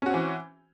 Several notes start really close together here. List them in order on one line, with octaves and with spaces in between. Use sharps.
C#4 F#4 C4 E3